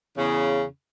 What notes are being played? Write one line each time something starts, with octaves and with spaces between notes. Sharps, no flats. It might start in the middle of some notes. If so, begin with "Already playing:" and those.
E2 C#3